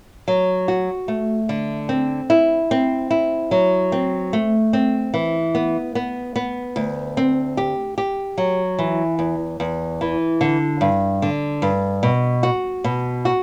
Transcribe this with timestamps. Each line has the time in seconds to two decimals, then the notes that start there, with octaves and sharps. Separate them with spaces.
0.28 F#3
0.68 F#4
1.08 A3
1.49 D3
1.89 C4
2.30 E4
2.71 C4
3.10 E4
3.51 F#3
3.92 C4
4.33 A3
4.73 C4
5.14 E3
5.55 B3
5.95 B3
6.36 B3
6.76 D2
7.17 C4
7.57 G4
7.98 G4
8.38 F#3
8.79 E3
9.19 E2
9.60 E2
10.01 E3
10.41 D3
10.81 G2
11.22 D3
11.62 G2
12.03 B2
12.43 F#4
12.84 B2
13.25 F#4